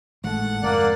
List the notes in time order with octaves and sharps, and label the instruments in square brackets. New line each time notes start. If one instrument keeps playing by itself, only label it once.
[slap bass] G#1 D#3 G#3 [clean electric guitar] A2 A4 [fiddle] F#5
[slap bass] F1 D#3 [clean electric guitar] G#2 [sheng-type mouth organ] A#3 D5 F#6